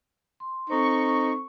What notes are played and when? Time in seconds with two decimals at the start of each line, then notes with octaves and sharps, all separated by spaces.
0.40 C6
0.70 C4 D#4 A4 C5 C#6